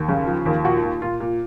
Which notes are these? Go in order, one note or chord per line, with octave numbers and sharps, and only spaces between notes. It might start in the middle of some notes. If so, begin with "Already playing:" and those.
Already playing: D#2
C#3
F3
D#2
A#2 F#4
A#2
A#2 F4
A#2